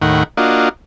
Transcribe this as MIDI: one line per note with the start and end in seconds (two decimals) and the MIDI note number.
0.02 0.23 39
0.02 0.23 45
0.02 0.23 51
0.02 0.23 70
0.02 0.23 78
0.37 0.69 58
0.37 0.69 62
0.37 0.69 65
0.37 0.69 66
0.37 0.69 75